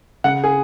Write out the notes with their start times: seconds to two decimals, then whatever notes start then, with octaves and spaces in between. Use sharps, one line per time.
0.24 C#3 F#5
0.44 G#4